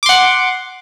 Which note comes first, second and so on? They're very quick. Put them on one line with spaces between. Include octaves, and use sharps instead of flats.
D6 C6 F#5